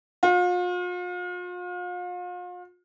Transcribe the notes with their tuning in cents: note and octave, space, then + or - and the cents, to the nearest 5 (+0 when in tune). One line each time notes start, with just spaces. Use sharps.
F4 +40